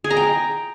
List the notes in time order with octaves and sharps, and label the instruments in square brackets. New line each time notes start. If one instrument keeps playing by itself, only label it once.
[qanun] G#4
A#5
G5